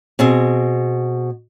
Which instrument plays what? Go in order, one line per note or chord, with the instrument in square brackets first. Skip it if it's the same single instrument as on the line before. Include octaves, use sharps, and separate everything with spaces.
[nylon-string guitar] B2 C4 G#4